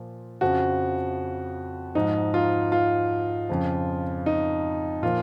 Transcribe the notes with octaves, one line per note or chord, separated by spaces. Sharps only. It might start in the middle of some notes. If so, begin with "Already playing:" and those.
Already playing: A#2 F3
F2 C#3 F3 F#4
G#2 F3 D#4
F4
F4
F2 C#3 F3
D#4
A#2 F3 F4